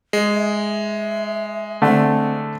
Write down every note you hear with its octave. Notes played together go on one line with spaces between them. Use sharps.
G#3
E5
D3 A3 C4